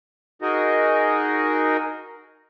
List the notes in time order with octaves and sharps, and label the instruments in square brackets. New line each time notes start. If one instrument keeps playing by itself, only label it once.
[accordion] D#4 F#4 G#4 A#4 D#5